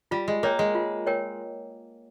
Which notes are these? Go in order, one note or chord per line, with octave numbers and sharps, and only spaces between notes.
G3 F4
G#3
A#3 A#4 C#5 G5
G#3
F4
A#4 C#5 G5